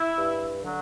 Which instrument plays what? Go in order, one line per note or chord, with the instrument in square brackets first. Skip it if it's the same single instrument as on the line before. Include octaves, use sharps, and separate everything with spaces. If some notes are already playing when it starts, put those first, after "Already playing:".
Already playing: [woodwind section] E4
G2
D3 F#3